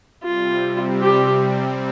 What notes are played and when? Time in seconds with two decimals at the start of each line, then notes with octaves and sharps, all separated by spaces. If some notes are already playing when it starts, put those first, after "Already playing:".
0.23 C3 G3 C4 F4
1.01 G4